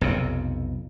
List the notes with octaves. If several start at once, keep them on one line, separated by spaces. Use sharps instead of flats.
B1 F2 C3